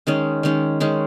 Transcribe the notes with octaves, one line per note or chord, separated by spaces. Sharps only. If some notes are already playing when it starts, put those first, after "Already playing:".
D#3 G#3 C#4
D#3 G#3 C#4
D#3 G#3 C#4